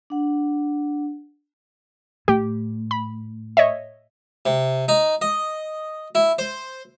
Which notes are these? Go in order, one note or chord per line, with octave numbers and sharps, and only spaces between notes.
D4 F#5
A2 G4
B5
C#5 D#5 E5
C3
D#4
D#5
E4
C5